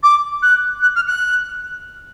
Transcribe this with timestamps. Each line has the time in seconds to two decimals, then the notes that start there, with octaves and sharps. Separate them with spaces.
0.02 D6
0.42 F#6
0.82 F#6
0.95 F6
1.07 F#6